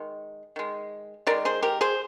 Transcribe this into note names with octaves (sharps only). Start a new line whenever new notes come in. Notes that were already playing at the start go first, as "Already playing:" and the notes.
Already playing: D#3 G#3
D#3 G#3
D#3 G#3 A#4 D5
G#4 C5
G4 A#4
G#4 C5